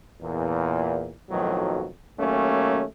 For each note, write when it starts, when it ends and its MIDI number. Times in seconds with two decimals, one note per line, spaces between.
0.21 1.12 40
0.21 1.12 46
1.30 1.88 35
1.30 1.88 41
1.30 1.88 45
1.30 1.88 51
1.30 1.88 53
1.30 1.88 54
2.19 2.83 39
2.19 2.83 54
2.19 2.83 57
2.19 2.83 58
2.19 2.83 61